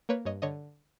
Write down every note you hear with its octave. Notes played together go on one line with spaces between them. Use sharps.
A#3 B4 C#5
G2 C#5 D#5
D3 C#5 D#5